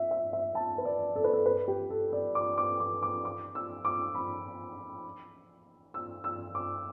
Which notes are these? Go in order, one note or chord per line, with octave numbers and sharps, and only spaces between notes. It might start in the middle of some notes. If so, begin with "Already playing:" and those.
Already playing: E5
E5
E5
A5
B4
D5
A4
B4
A4
B4
G4
A4
D5
D6
D6
D6
D6
D6
E6
D6
B5
E6
E6
D6